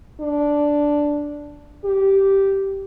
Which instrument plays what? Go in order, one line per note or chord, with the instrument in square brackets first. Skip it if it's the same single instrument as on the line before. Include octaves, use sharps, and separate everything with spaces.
[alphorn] D4
G4